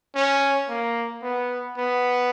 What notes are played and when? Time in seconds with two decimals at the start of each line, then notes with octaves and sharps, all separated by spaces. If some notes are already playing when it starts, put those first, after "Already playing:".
0.15 C#4
0.69 A#3
1.23 B3
1.77 B3